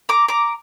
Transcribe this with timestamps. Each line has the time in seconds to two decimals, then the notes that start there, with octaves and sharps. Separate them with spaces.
0.09 A#5 D6
0.28 A#5 D6